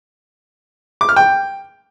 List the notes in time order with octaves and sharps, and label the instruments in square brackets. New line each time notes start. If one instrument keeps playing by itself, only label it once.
[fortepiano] D6
F6
G5